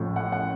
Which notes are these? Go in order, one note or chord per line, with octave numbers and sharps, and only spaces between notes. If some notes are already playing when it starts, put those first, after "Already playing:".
Already playing: A1 A2 F3
F#5
F#5